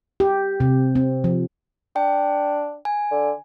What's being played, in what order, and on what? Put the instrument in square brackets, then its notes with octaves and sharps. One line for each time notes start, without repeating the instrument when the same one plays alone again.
[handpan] G4
C3
C4
F3
[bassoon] D4 [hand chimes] G5
[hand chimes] G#5
[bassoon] D3